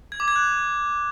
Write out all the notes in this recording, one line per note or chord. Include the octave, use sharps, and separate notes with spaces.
G#6
D6
G#6
F#6